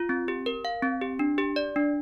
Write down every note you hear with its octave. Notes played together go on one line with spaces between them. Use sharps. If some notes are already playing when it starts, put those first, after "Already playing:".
Already playing: F4
C4
G4
A#4
F5
C4
G4
D4
G4
D5
D4